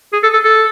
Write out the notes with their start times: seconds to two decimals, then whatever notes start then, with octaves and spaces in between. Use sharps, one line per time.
0.13 G#4
0.23 A4
0.33 A4
0.44 A4